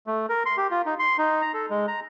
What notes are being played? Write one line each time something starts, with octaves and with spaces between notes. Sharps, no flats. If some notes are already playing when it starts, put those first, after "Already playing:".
A3
A#4
C6
G4
F4
D#4
C6
D#4
A#5
A4
G#3
A#5